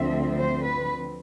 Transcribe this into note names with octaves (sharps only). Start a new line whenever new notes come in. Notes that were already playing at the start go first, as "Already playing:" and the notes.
Already playing: D2 D3 F3 C4 E5
C5
B4